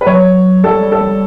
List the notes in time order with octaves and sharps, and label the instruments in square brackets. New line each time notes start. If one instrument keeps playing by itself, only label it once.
[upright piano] B4
[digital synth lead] F#3 [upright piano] C#5
[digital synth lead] G3 [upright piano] A4
[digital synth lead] G3
[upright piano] A4
[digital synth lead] G3